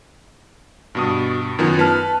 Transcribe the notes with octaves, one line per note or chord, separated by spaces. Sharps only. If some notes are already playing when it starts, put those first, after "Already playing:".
G2 B2 F#4 D#6
F#2 D#3 B3 F4
B4 A5 F6